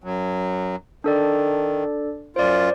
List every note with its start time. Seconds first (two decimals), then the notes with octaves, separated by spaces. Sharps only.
0.04 F#2 F#3
1.04 D#3 D4 A4 D5
2.36 F#2 F4 C5 D5